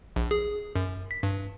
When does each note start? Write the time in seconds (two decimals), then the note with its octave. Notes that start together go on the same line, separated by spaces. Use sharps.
0.16 A#1
0.31 G#4
0.76 F#2
1.11 B6
1.23 G2